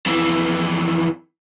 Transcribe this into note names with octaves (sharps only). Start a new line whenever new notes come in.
F2 E3